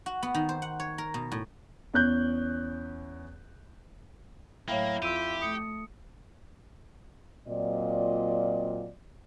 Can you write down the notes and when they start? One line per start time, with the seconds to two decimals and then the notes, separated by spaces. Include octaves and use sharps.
0.06 F#4
0.23 B3
0.34 D#3
0.49 C5
0.62 F#5
0.80 C#5
0.98 A#4
1.14 B2
1.32 A2
1.94 E2 C#4 F#6 G6
4.68 A2 F#3 A#3 E4 C#5 F5 G5
5.02 F2 F4 G4 E6 D7 D#7
5.41 A3 D#6 C#7
7.48 A#2 F#3 C4 F4 D5 D#5